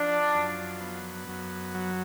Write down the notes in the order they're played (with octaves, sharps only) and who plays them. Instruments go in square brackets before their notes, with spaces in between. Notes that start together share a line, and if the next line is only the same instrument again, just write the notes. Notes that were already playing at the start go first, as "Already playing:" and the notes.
Already playing: [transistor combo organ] F3 [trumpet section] D4
[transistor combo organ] F#2
B3
F#2
F#3